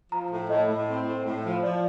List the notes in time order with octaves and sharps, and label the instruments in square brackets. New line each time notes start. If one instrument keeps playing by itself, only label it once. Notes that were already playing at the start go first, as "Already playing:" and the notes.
[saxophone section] F3 [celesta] A#5
[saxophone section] A2
[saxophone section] A2 [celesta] D#5
[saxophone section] A2
C4
A2
A2
F3
[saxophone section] F3 [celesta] D5